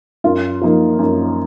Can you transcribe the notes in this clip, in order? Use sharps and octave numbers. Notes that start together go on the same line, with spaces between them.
F#2 F4
F3 A#3 D#4
F#2